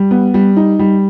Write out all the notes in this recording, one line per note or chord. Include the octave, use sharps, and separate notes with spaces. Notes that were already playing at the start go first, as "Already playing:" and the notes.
Already playing: G3
B3
G3
D#4
G3